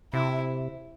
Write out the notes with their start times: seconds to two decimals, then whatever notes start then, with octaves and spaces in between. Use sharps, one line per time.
0.13 C3 E4